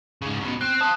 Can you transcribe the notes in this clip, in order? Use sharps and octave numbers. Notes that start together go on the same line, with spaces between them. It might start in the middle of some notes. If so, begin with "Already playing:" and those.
G#2 C#3
F#2 B2
C4 F#6
F5 A5 D#6